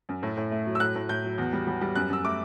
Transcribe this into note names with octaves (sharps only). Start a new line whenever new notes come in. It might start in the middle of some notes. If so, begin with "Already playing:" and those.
F#2
A2
A2
A3
F#3
E6
A2 F#6
A2
A2 G6
F#3
E2
G3
G3
G3
F#2 F#6
F#2 E6
A3 D6